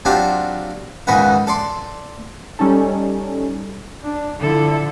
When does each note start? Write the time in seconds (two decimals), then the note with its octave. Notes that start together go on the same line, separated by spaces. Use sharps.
0.05 F#3 C4 D4 F4 G4
1.07 C#2 G#2 D#3 B4 F#5
1.47 A4 D5 C6
2.59 G3 C#4 D#4 A4
4.03 D4
4.40 D3 F3 E4 A4